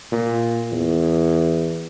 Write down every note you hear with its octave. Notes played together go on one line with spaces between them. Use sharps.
A#2
E2